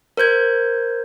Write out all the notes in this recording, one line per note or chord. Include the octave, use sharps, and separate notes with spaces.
A#4 C5 G6 G#6